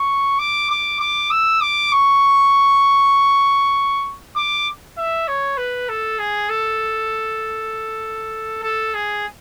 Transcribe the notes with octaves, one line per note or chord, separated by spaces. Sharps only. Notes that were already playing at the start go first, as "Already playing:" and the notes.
Already playing: C#6
D6
D6
D6
E6
D6
C#6
D6
E5
C#5
B4
A4
G#4
A4
A4
G#4